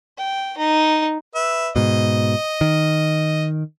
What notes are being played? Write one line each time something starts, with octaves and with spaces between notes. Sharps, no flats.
G5
D#4
B4 E5
G#2 B2 D#5
D#3